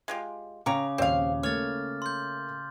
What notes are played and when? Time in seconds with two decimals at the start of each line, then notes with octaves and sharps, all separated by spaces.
0.08 G#3 F4 G4
0.66 C#3 C#4 G5 A#5 D6
0.98 D#1 C4 C#5 F5
1.43 A3 A#3 C#5 F6 A6
2.02 C6 G6